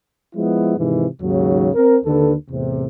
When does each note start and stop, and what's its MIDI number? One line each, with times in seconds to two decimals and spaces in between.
0.35 0.77 53
0.35 0.77 56
0.35 0.77 59
0.35 0.77 64
0.77 1.06 44
0.77 1.06 48
0.77 1.06 51
0.77 1.06 52
1.21 1.69 39
1.21 1.69 44
1.21 1.69 49
1.21 1.69 54
1.74 1.97 60
1.74 1.97 70
2.04 2.33 39
2.04 2.33 50
2.04 2.33 69
2.04 2.33 71
2.50 2.84 40
2.50 2.84 45
2.50 2.84 48